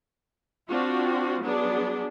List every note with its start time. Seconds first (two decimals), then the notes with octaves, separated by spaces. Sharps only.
0.69 C4 D4 F4 F#4
1.42 F#3 B3 D4 G#4